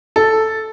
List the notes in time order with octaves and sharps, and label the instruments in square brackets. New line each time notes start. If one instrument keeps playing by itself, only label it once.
[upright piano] A4